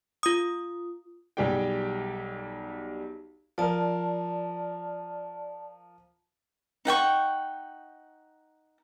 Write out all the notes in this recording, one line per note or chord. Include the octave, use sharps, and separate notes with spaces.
F4 D#6
B1 G3 G4 G#4 G5
F3 A#4 D5 A5
D#4 F#5 G5 C#6